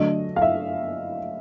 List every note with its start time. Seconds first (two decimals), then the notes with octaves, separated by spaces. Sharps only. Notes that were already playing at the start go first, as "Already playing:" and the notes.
Already playing: D3 F#3 A3 D4 D#5
0.36 F5
0.42 E5